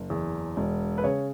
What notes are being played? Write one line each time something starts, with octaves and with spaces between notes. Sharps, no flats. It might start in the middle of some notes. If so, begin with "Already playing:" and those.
Already playing: F#1
E2
E1
B4
C#3 C#5